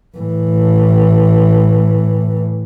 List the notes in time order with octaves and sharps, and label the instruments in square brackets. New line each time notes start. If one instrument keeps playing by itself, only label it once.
[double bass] A2 E3